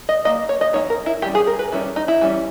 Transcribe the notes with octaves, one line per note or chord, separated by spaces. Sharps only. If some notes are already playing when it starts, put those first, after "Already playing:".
D#5
D#3 A#3 D#5
C#5
D#5
E3 A#3 D#4 C#5
A#4
E4
E3 G3 C#4 G4
G#4
A#4
B4
D#3 G3 C#4 E4
D#4
E4
E3 G3 C#4